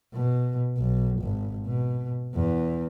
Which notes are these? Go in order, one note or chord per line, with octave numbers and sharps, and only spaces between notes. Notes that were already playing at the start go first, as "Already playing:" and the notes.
B2
B1
G#1
B2
E2